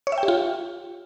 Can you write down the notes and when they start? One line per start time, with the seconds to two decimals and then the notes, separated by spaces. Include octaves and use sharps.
0.07 C#5
0.12 E5
0.18 G5
0.23 G4
0.28 F4